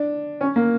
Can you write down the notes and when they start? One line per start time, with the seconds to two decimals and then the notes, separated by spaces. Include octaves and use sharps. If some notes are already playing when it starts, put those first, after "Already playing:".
Already playing: D4
0.41 C#4
0.56 A#3